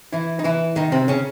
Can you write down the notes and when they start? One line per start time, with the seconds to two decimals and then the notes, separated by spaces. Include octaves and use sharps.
0.13 E3 E4
0.39 D#4
0.44 E3 E4
0.76 D#3 D#4
0.92 C3 C4
1.08 C#3 C#4